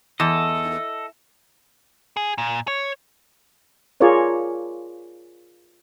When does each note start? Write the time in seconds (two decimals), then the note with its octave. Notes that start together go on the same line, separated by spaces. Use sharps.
0.20 E2 A4 D#5
2.17 G#4
2.38 A#2
2.68 C#5
4.00 F4 G#4 A#4 C#5 D5